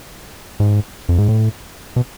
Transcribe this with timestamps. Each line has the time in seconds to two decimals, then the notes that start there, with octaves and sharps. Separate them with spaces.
0.60 G#2
1.09 F2
1.18 G#2
1.29 A2
1.96 B2